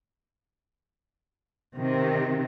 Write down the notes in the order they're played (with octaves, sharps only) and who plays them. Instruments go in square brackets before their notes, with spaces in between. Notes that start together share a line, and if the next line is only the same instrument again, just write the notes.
[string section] C3 D#3